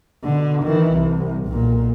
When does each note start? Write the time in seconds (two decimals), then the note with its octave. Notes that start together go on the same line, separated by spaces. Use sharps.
0.24 B2 D3
0.63 D#3 E3
0.93 C2
1.47 B1 A#2